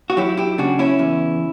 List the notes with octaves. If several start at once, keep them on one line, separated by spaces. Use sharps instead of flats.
F#4
F#3 E4 G4
E4 G4
C#3 D4 F#4
C#4 E4
E2